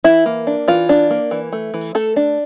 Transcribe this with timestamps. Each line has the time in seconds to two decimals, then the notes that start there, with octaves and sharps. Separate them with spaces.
0.04 E3 E4
0.26 A#3
0.47 D4
0.68 E3 F4
0.89 D4
1.10 A#3
1.31 E3
1.52 A3
1.74 E3
1.95 A3 A4
2.16 D4